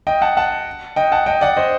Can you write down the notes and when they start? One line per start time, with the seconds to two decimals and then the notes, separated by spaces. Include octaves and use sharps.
0.07 D#5 G5
0.22 F#5 A5
0.37 F#5 A5
0.96 D#5 G5
1.12 F#5 A5
1.26 D#5 G5
1.41 D5 F#5
1.57 C5 D#5